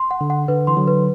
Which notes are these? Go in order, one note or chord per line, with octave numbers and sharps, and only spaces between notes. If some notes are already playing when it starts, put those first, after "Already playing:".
Already playing: C6
F#5
D3
F#5
D3 B4
E3 C6
D3 F#3
B4